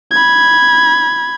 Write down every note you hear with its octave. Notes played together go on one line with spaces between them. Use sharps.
B5 G#6